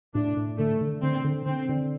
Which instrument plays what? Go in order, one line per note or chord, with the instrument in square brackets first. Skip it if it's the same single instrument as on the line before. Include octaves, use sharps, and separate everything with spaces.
[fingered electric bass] A2 [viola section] D4
[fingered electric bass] A2
[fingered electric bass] D3 [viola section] A3
[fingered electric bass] D3
[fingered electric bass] D3 [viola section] C4
[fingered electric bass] D3
[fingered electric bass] D3 [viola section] C4
[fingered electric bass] D3